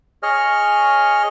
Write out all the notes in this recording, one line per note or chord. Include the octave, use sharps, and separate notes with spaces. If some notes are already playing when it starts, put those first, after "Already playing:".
G#4 C#5 D#5 F6